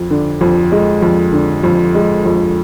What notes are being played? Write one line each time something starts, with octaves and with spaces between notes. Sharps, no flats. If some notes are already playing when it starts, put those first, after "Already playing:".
Already playing: F2
D3
F2
G#3
F2
D3
F2
G#3
F2